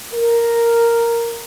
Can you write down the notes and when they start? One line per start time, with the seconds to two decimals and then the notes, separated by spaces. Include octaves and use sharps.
0.13 A#4